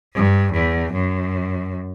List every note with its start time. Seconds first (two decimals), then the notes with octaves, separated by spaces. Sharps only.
0.14 G2
0.52 E2
0.92 F#2